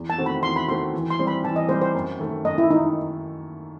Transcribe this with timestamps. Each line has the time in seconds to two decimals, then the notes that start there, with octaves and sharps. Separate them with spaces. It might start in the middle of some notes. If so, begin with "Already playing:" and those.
Already playing: E2
0.10 A5
0.18 D#3 A3 C4 F#4
0.26 B5
0.43 E2 C6
0.56 B5
0.68 D#3 A3 C4 F#4 C6
0.94 E3
1.10 C6
1.19 G3 C4
1.27 B5
1.44 E3 A5
1.56 D#5
1.69 G3 C4 C5
1.82 C5
1.95 F#2
2.19 D#3 A3
2.45 F#2 D#5
2.58 E4
2.70 D#3 D#4